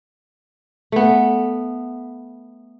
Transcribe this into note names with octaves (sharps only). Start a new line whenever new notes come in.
A3 B3